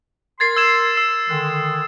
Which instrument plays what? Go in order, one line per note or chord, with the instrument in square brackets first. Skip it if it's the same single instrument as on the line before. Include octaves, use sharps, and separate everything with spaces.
[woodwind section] A#4 C6 [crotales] G#6 A6 C7
[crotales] E6 G#6 E7
E6
[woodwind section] D3 D#3 G#3